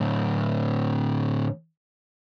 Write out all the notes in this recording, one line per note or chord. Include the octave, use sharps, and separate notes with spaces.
A2 D3